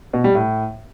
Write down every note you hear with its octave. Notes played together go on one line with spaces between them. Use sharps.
B2
G3
A2